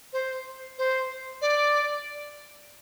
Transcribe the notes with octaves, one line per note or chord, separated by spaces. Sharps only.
C5
C5
D5